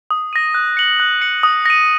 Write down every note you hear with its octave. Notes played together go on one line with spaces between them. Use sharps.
D#6
A#6 D#7
F#6
C#7 F#7
F#6
C#7 F#7
D#6
A#6 D#7